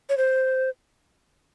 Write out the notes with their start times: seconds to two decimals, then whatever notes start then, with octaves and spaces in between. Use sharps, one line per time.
0.09 C#5
0.17 C5